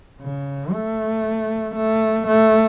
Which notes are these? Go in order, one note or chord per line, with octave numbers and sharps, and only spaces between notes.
C#3
A3
A3
A3